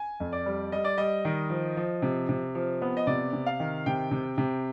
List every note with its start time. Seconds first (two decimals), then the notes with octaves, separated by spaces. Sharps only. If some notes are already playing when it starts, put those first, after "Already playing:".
Already playing: G#5
0.20 F2
0.32 D5
0.46 G3
0.72 G3 D#5
0.84 D5
0.98 G3 D#5
1.25 D#3
1.50 F3
1.77 F3
2.02 C3
2.29 C3
2.55 F3
2.82 B3
2.97 D#5
3.07 C3 D5
3.33 C3
3.46 F5
3.60 D#3
3.86 C3 G5
4.11 C3
4.38 C3